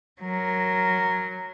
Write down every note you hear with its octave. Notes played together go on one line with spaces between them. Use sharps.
F#3 A#4